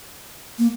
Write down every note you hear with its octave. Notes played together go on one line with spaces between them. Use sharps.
A#3